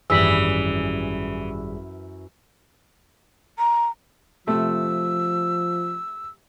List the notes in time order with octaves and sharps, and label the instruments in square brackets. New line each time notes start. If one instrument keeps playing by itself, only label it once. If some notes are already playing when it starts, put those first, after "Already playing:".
[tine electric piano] G#1 G3 G#4 [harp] F#2 [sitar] E3 [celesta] E6 B6 F#7
[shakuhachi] A#5
[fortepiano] C3 A3 [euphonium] F3 [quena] E6